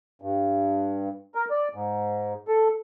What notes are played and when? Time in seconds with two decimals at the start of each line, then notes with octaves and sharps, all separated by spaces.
0.22 G2
1.35 A#4
1.51 D5
1.74 G#2
2.48 A4